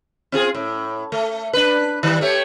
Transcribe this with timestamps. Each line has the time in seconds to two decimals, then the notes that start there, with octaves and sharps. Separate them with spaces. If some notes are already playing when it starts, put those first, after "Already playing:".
0.32 C4 F4 G#4
0.55 A2
1.12 A3
1.53 D4 B4
2.03 D#3 G3
2.21 A3 G4 C#5